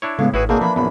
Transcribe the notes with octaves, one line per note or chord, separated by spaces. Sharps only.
D4 E4 C#5
A2 C#3 G#3 B3 F5
G#1 E4 F#4 G#4 B4
B2 A#3 C4 D4 G#4
E3 F3 B5
A#1 F#2 B3 B5